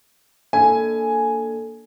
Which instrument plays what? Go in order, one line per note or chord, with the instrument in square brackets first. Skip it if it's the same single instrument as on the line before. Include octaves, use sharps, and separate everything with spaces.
[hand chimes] A#3 D4 A4 [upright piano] G#5